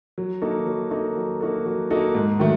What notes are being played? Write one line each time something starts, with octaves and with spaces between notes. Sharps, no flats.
F#3
A#3 D#4 F#4 A4
F#3
A#3 D#4 F#4 A4
F#3
A#3 D#4 F#4 A4
F#3
A#3 D#4 F#4 A4
G#2
D#3 F#3 A3